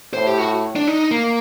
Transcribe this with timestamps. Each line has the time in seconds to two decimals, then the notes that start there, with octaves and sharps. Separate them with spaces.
0.14 A2 C5
0.27 G4
0.38 F#4
0.76 D4
0.87 D#4
1.11 A#3